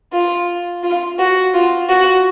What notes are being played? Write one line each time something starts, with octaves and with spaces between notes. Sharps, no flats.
F4
F4
F#4
F4
F#4